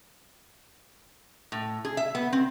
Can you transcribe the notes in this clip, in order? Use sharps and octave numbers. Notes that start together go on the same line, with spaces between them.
A2
G#4
E5
B3
C4